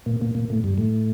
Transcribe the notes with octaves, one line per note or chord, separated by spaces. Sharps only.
A#2
A#2
A#2
A2
G2
A2